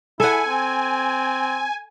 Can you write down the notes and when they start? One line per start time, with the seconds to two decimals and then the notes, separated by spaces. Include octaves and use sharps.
0.20 E4 A4 F#5 G#5
0.48 C4